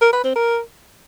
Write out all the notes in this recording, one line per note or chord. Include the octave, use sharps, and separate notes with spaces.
A#4
B4
C4
A#4